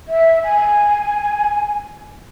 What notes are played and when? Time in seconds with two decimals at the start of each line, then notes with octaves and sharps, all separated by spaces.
0.08 E5
0.44 G#5